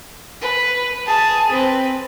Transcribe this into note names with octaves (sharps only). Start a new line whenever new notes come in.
B4
G#4 A5
C4 B4